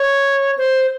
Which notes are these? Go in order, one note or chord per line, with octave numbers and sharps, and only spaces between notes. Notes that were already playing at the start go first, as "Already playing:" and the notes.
Already playing: C#5
C5